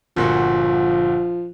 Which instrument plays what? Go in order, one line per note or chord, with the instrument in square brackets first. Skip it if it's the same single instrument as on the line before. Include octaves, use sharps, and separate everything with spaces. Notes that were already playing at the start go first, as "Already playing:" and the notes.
[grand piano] G1 A#2 F#4 [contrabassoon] F3